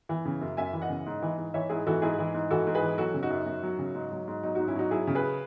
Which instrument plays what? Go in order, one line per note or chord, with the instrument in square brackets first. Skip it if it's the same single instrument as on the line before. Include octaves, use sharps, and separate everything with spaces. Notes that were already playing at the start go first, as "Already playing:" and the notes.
[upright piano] E3
C#3
F#2
F#2 E5 G#5
E3
D#5 F#5
C#3
G#2
E3
G#2
E3 C#5 E5
G#2 E4 G#4
E3 F#4 A4
G#2 E4 G#4
E3
G#2
E3 F#4 A4
G#2
G#4 B4
E3
F#3 F#4 A4
C#3
D#4 F#4
F#2
F#2
F#3
C#3
G#2
F#3
G#2
F#3 D#4
D#4 F#4
G#2
C#4 E4
F#3 D#4 F#4
F#3 E4 G#4
C#3
G#4 B4